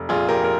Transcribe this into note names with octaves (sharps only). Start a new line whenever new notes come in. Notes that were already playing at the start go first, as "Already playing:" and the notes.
Already playing: F1
A#1 F4 G#4
G4 A#4
A#4